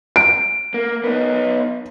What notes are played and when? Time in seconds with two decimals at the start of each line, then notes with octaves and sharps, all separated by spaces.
0.16 D7
0.74 A#3
1.04 B3 D#4